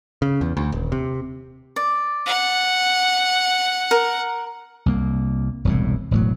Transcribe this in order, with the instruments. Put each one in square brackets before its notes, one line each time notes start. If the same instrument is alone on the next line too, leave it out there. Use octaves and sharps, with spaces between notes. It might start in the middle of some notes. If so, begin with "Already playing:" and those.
[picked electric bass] C#3
E2
D2
D#1
C3
[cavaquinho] D5
[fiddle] F#5
[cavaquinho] A#4
[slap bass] C2 A#3
E1 C2 A2
E1 A2 F#3